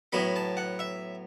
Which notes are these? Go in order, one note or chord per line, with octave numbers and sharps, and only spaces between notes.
A2 F#3 B3 B5
A5
F#5
E5